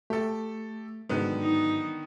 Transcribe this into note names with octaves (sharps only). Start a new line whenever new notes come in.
A3 G4 A4
G#2 D3 D#3 F#3 B3
D#4